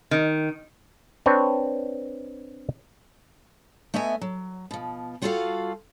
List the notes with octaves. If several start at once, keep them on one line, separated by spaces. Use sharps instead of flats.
D#3
C4 D4 B4 C#5
A3 B3 D#5 E5 G#5
F#3
B2 F3
G3 F4 F#4 A4 E5 F5